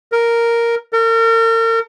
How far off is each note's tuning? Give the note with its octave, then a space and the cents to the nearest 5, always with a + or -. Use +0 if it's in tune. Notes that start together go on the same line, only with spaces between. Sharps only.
A#4 +0
A#4 -40